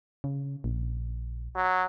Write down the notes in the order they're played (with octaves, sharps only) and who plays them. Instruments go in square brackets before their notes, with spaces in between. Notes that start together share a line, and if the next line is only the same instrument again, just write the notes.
[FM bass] C#3
A#1
[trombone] F#3